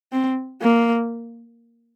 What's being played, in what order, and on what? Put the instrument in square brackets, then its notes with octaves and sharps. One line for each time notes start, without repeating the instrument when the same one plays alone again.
[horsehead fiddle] C4
A#3